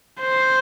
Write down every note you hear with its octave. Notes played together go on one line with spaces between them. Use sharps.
C5